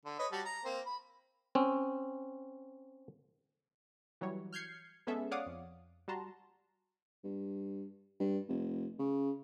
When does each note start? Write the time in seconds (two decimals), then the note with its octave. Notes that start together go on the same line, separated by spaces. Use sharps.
0.06 D3
0.19 B4 C#5 D#5
0.32 G3 F#4 A5
0.45 A#5
0.65 A#3 C4
0.86 B5
1.55 C4 C#4
4.21 E3 F#3 G3 C#5
4.53 F6 G6 G#6 C7 C#7
5.07 G#3 B3 C#4 G#4 A4 E5
5.31 C#5 D5 F5 F#5 D6 D#6
5.46 F2
6.08 G3 F#4 A5 A#5 C6
7.24 G2
8.20 G2
8.48 F1
8.99 C#3